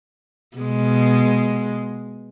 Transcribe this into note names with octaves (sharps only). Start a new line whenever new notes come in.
B2 G#3